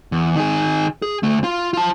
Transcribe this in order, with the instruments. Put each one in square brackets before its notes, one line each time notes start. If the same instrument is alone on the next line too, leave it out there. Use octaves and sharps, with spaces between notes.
[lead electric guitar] E2
D#3 G#4
G#4
D2 A3
F4
F4 A5